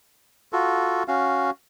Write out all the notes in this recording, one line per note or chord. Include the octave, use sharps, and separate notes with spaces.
F4 F#4 A4
C#4 F#4 F5